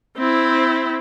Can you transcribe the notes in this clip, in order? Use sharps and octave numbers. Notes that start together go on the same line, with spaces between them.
C4 E4